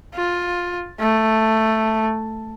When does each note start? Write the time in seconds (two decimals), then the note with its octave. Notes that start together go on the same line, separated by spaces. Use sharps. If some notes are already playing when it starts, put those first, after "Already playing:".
0.15 F4
1.00 A3